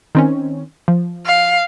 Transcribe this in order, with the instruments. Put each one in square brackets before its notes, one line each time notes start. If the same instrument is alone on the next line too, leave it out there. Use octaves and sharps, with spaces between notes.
[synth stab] D#3 C4 C#4
F3
[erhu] F5